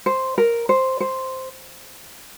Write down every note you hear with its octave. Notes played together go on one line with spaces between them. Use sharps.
C5
A#4
C5
C5